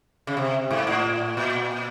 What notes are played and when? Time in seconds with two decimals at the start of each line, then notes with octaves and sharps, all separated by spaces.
0.27 C#3
0.37 C3
0.71 G#2
0.87 A2
1.37 A#2